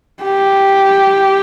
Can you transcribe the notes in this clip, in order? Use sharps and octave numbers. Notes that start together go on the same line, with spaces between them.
G4